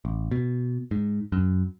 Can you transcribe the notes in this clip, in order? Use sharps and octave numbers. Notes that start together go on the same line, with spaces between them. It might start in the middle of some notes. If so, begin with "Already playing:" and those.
A1
B2
G#2
F#2